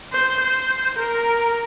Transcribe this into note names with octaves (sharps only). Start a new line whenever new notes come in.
C5
C5
A#4